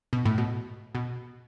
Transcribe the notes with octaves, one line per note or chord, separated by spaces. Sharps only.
B2
A2
B2
B2